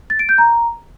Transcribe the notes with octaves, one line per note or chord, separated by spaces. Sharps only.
A6
D7
G6
A#5